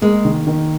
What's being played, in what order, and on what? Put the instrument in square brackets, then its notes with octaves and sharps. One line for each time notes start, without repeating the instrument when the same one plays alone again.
[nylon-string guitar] G#3 [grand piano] A#3
[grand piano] D#3
D#3